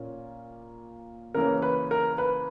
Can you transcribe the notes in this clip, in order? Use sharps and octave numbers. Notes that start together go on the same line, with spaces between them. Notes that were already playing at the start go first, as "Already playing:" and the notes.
Already playing: A#2 A#3 C#4
C#3 E3 A#3 C#4 A#4
B4
A#4
B4